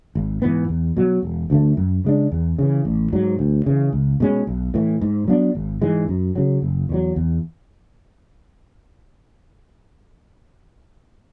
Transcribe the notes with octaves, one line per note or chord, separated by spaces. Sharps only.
G#1
G#2 E3 B3
E2
B2 F#3
E1
D2 D3 A3
F#2
C#3 G#3 D4
E2
C#3 E3
A1
G#2 F#3
D2
C#3 E3
C#2
B2 G#3 C#4
B1
A2 E3
G#2
F#3 B3 D4
G#1
G#2 E3 G#3
F#2
C#3 F#3
F#1
E2 D3 F#3
E2